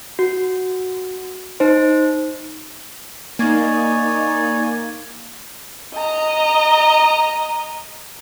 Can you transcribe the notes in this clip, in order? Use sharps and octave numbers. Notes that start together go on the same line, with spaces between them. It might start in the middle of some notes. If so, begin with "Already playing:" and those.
F#4
D#4 C5
A#3 D#4 C#5 D5 G#5
D#5 A#5